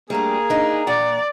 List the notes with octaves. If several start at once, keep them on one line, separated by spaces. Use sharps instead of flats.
G3 A3 A#3 D4 G#4 A#5
D4 D#4
A#2 D5 F#5